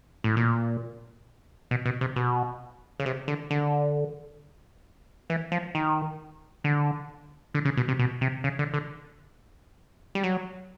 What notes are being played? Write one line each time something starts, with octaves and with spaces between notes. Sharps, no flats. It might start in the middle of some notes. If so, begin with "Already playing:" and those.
A2
A#2
B2
B2
C3
B2
C#3
C3
D3
D3
E3
F3
D#3
D3
D3
C#3
B2
C3
B2
C3
C#3
D3
D3
G3
F#3